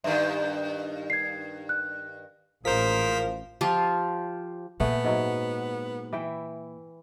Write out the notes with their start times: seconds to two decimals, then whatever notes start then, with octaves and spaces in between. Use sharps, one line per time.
0.04 G2 D#3 E5
1.10 G#6 C7
1.69 F#6
2.65 A1 F3 A#3 G#4 A#4 C5 B6
3.61 F3 F4 G4
4.80 A#2 A3 B3 G#4
5.04 G#2 F#3
6.13 E3 E4 G5